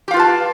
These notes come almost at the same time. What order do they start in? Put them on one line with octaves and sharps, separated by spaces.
G4 F5 F4 B4 A5